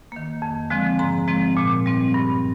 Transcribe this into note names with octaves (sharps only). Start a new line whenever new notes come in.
D#3 A#3
F2
D3 F3 G#3 C4
G#2 A#5
F3 G#3 C4
A#2
G3 C4
G2